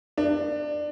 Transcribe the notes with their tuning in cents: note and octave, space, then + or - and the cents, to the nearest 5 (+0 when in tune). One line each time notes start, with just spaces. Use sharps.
D4 +20